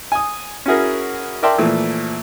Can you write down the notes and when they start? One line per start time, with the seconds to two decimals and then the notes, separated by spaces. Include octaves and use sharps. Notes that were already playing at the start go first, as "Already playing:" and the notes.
0.12 G#5 D#6
0.66 C#4 E4 F#4 G#4 A#4
1.43 A#4 D5 E5 G5 A5 C6
1.58 A#2 E3 F3 A3